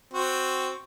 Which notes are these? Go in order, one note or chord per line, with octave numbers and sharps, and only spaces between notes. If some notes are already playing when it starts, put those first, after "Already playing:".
C4 F#4